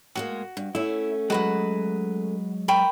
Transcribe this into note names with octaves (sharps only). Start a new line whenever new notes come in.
A2 G#3 A#3 F#4
G2
A3 C#4 E4
F#3 G#3 F#4 B4 F#5
A#4 G5 B5 C#6